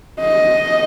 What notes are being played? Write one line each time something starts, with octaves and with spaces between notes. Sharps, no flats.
D#5